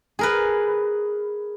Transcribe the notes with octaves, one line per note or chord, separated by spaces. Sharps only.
G#4 A#4 B4